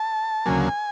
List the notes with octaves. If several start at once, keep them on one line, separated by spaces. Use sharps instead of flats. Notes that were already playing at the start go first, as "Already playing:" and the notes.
Already playing: A5
D2 C#3 F#3 A#3 G#5